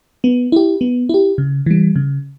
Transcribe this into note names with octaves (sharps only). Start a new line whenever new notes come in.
B3
E4 G4
B3
E4 G4
C#3
E3 G3
C#3